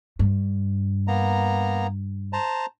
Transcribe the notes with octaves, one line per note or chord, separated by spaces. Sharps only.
G2
A#3 B3 A#5
C5 A5 A#5